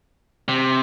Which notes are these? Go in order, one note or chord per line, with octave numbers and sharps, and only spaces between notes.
C3